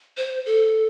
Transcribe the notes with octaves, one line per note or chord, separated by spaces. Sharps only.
C5
A4